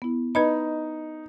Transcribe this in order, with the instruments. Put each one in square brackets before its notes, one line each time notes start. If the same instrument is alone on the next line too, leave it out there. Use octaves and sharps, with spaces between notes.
[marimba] B3 E4
[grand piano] D#4 [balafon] B4 D#5 B5